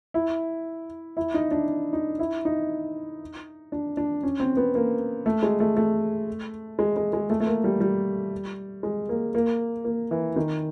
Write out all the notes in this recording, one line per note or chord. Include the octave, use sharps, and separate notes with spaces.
E4
E4
D#4
D4
D#4
E4
D#4
D4
D4
C#4
C4
B3
A#3
A3
G#3
A3
A3
G#3
G#3
G#3
A3
A3
A#3
G3
G3
G#3
A#3
A#3
A#3
E3
D#3